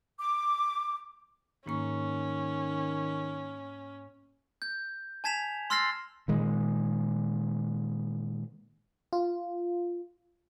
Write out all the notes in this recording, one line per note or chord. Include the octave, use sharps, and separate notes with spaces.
D6
G#2 D#3 A#3 C#4 C#6
G6
G#5 A5 G#6 B6 E7 F7
C6 E6 F6 A6 A#6 C7
A#2 D#3 G#3
F4